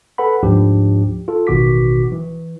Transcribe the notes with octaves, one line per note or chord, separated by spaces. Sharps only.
A4 B4 F#5 B5
D2 G#2 F3 D4 G4
F4 A4
A1 B2 D#3 F#4 D6 B6
E3